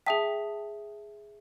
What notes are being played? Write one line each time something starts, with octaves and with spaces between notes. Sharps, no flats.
G#4 E5 G5 A5 D#6 B6